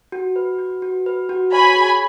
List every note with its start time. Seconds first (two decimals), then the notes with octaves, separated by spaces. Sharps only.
0.12 F#4
0.36 B4
0.59 F#4
0.82 F#4
1.06 B4
1.29 F#4
1.53 C#5 G#5 B5
1.76 G#4